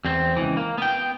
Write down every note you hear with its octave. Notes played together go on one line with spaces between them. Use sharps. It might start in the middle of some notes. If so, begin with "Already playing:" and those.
E2 C4
C#2 E3
A#3
B3 G5